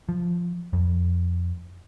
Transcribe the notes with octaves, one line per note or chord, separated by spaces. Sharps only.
F3
F2